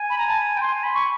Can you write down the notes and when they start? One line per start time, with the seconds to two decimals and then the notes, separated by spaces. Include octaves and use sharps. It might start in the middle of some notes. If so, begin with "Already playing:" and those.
Already playing: G#5
0.10 B5
0.18 A#5
0.28 A5
0.57 G5
0.61 G#5 C6
0.83 B5
0.94 C#6